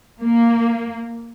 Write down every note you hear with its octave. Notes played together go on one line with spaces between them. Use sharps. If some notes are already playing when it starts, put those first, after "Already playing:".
A#3